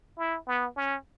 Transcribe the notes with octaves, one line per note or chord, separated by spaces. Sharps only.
E4
B3
C#4